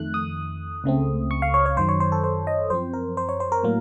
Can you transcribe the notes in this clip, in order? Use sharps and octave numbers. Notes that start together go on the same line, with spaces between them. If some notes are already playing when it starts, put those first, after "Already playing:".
Already playing: F2 D#3 A3 F#6
D#6
C#2 C#3 A3 C4
C#6
F5
C#5
C#5
F#2 D#3 F#3 C5
C#5
C5
A4
C5
D#5
F#2 F3 C4 C5
A#4
C5
C#5
C5
A#4
A2 F#3 A#3